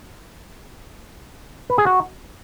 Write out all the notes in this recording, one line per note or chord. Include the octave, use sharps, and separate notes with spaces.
B4
G#4
F#4